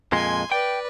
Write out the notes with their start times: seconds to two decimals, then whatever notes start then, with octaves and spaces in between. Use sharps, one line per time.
0.12 F2 A#2 G#3 G#5 C6
0.52 B4 D5 G5